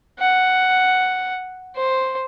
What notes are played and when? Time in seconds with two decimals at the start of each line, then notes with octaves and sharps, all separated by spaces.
0.19 F#5
1.76 C5